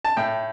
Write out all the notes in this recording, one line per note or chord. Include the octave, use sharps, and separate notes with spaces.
A5
A2 G5